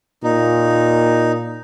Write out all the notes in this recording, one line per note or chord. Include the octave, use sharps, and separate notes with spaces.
A#2 D#4